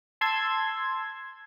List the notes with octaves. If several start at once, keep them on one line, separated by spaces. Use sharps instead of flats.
A5 C6 E6 G#6